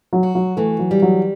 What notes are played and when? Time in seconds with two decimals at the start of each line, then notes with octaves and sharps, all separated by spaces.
0.13 F#3
0.23 F#4
0.35 F#3
0.57 E3 A3
0.79 F#3
0.91 G3
1.02 F#3